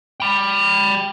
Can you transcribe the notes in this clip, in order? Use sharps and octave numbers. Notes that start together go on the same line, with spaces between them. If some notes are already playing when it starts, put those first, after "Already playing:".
G5 B5